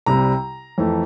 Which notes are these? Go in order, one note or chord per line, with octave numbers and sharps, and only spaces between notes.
C2 C3 G3 A#5
F2 E3 A3